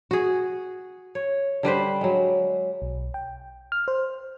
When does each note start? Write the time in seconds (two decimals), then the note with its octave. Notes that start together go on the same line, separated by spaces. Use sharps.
0.11 F#4 G#4
1.15 C#5
1.63 D3 G3 B4 C5
2.01 F#3 G#3
2.82 B1
3.14 G5
3.72 F6
3.88 C5